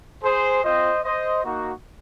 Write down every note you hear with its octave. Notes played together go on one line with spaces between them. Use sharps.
G#4 C5
C4 F4 C5 D#5
C5 D#5
A#3 D#4 F#4